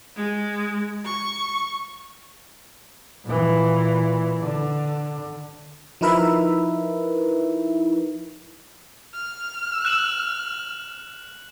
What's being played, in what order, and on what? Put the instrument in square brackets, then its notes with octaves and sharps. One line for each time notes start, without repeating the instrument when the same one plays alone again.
[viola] G#3
C#6
[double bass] A#2 E3
D3
[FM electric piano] F3 D#4 E4 A#4 B4 E5
[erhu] F6
[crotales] F#6 E7 F#7